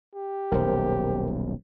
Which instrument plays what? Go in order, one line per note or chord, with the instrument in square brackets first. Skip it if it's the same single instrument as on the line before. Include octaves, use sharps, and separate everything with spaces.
[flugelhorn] G4
[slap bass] D#1 B1 [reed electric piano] A#4 C5